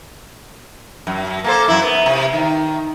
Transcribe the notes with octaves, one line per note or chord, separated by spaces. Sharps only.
F#2
A#3 A4 C5
F#2 E4
B3
C3
D#3